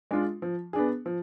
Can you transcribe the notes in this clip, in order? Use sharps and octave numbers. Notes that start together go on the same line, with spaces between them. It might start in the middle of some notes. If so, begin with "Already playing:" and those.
G#3 D4 F4
F3
B3 D4 G#4
F3